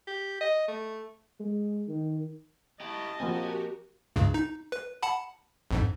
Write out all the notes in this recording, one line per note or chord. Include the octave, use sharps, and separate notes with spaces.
G4
D#5
A3
G#3
D#3
E4 G4 D#5 A5
F3 A#3 C4 F#4 G4 A#4 G#5
C#2 G2 C#3
D#4
B4
F#5 A5 B5
A#1 F2 G#2